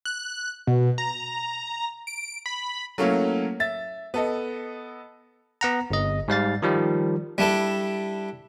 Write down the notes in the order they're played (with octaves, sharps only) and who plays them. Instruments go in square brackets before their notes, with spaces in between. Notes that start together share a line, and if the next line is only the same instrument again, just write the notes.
[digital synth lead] F#6
B2
A#5
D7
B5
[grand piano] F#3 A3 A#3 C#4 E4
E5 A6
B3 A4 D#5
[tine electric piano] B3 F#5 A#5
G1 D#5
G#2 G3 F5 A6
D#3 F3 G3
[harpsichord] G3 D4 E4 A4